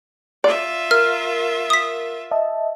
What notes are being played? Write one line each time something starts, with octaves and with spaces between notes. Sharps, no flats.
F4 D5 E5
A#4 F6
D#6 B6
D#5 E5 A5